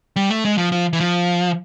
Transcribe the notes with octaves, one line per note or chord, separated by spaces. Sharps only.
G3
A3
G#3
F3
F3
E3
F3